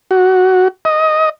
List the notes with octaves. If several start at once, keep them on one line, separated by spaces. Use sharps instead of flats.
F#4
D#5